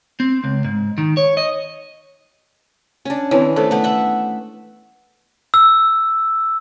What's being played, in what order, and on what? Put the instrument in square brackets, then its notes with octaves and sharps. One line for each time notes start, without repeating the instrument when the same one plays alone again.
[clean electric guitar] C4
C#2
G#2
D#3
C#5
D#5
[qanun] C#4 D4
[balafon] D#3 C4 C#5 [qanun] E3
[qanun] A3 [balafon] A4 C5
[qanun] A3 B3
E5 F#5
[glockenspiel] E6